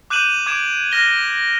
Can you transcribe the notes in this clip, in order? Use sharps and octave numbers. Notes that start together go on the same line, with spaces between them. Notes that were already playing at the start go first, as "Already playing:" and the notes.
D6 F#6 G6 D#7 E7 F#7
D6 G#6 D7 E7
F6 F#6 A#6 G7